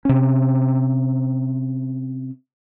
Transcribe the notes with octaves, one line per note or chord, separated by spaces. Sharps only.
C3 C#4